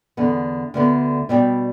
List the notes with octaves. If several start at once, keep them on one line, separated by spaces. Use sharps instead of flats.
E2 D3 B3
D2 D3 B3
B2 G3 D4 G4